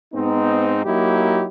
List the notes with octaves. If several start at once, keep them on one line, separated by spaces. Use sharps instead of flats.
G#2 B3 C4 D#4
F#3 A#3 D#4 E4 G4